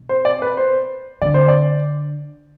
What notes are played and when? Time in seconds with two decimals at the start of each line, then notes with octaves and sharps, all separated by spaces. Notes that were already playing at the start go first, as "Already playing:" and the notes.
Already playing: B2
0.09 C5
0.25 D5
0.42 B4
0.57 C5
1.22 D3 D5
1.34 C5
1.48 D5